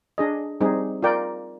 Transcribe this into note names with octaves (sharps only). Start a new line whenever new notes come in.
D4 G#4 D#5
G3 C4 D#4 G#4
F4 A#4 D5 G5